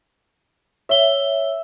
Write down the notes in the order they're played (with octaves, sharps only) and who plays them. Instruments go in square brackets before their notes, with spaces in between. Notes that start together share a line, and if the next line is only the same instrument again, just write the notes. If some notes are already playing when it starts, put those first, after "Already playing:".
[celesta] C#5 G7 [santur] E5